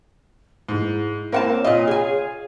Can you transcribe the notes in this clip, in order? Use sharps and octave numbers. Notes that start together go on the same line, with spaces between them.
G#2 E4
A#3 C4 A#4 F#5 A5
C#5
A#2 F4 D#5
G#4 G#5